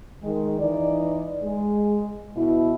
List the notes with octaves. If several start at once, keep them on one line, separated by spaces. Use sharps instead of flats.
D#3 G#3
E3 D#4 D5
G#3
B2 E4